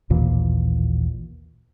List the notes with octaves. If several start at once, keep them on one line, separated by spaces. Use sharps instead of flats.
A1 D#2 A#2 E3